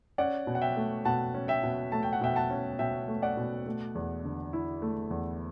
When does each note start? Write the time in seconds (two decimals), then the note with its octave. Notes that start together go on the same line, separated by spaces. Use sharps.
0.18 C#4 D5 F#5
0.47 B2
0.55 F#5
0.61 E5 G5
0.76 A3
1.05 B2 F#5 A5
1.34 C#4
1.48 E5 G5
1.63 B2
1.92 A3 A5
2.03 G5
2.13 F#5
2.21 B2 E5 G5
2.36 F#5 A5
2.50 C#4
2.79 B2 E5 G5
3.08 A3
3.22 D5 F#5
3.37 B2
3.66 A3
3.95 E2
4.24 D3
4.53 E4
4.82 A3
5.10 E2